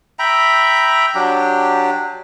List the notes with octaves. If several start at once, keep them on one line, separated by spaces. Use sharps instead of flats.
E5 G5 A#5 B5
F#3 D4 G4